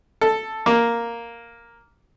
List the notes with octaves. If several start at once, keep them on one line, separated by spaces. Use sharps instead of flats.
A4
A#3